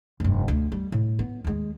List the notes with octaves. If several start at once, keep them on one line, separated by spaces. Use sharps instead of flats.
F1 G2
D2
G3
A2
B3
D#2 G#3